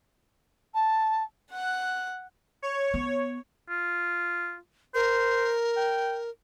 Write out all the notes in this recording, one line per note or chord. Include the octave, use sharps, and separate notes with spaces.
A5
F#5 F#6
C#5
B3
F4
A#4 C5
G5